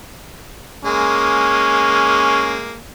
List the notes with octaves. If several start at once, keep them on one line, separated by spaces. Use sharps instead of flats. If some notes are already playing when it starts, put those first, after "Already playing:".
G#3 A#3 C#4